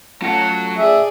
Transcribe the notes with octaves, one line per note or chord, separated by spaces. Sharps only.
F#3 A3 C#4 F4 A4 F#5
G#4 D5 E5